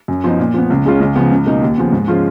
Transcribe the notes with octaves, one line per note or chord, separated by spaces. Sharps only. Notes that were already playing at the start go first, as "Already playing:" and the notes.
F#2
F3 B3 D#4
A#2
F3 B3
C#2
C#3 G#3 C#4 F4
C#2
C#3 F3 B3
C#2
B2 A#3 D#4
D#2
C#3 F3 B3
G#2
F3 G#3 C#4 F4